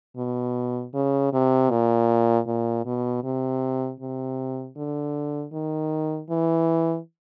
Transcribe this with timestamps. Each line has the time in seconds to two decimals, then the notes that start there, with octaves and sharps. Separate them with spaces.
0.17 B2
0.94 C#3
1.33 C3
1.70 A#2
2.47 A#2
2.85 B2
3.23 C3
4.00 C3
4.76 D3
5.53 D#3
6.30 E3